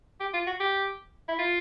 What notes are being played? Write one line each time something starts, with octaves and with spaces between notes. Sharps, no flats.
G4
F4
F#4
G4
E4
F4